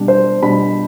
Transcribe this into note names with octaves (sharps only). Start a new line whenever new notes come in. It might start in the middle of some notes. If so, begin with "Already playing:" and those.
Already playing: B2 G3 D4
C5
B2 G3 D4 B5